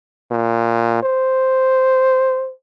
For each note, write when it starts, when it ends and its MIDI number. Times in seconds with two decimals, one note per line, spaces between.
0.31 1.01 46
1.03 2.52 72